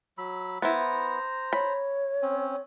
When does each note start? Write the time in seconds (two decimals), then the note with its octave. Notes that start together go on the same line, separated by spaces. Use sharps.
0.18 F#3 B5 E6
0.62 B3 E4 C5 A#5
1.53 C#5 B5
2.22 C4 C#4